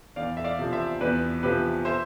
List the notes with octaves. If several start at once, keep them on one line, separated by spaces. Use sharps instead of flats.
E2 D5 F5
E5
D5 F5
C3 F3
C5 E5
E2 B4 D5
C3 F3 G4 B4
C5 E5